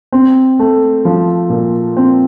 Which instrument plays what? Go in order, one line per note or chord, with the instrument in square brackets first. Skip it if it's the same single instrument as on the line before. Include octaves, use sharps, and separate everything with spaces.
[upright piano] C4
A3
F3
A#2
C4